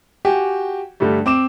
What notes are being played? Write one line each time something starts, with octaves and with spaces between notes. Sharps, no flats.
F#4 G4 G5 G#5
G2 D3 G3 A3
C4 D6 E7